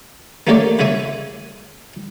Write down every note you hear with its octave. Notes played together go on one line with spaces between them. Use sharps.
A3 A#3 C#4 G4 C#5 D5
C#3 G#3 C#5 E5 G#5